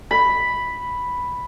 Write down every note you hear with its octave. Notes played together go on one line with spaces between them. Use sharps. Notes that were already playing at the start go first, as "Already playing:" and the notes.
B5